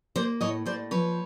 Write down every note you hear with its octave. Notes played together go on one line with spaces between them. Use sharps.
A#3 C5 D5
A2 C#5 D#5
A2 C5 D5
F3 B4 C#5